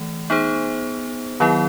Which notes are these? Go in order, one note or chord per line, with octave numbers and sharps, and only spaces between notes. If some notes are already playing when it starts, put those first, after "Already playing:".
Already playing: E3 A3
B3 D#4 G#4 C5
D#3 F#3 B3 E4